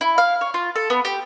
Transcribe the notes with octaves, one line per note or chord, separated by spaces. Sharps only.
E4
F5
C#5
F4
A4
B3
G4